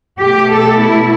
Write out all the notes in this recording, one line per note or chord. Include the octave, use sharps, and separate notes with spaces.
B2 A3 G4
A4
E4